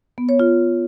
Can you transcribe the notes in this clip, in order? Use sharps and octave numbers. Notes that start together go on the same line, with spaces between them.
B3
C#5
F4